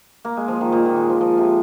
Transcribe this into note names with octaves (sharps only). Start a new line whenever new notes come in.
A#3
G#3
F3
D#3
A#2
D#3
G#3
F3
F3
C3